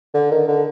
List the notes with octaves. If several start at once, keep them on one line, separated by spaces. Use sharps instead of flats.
D3
D#3
D3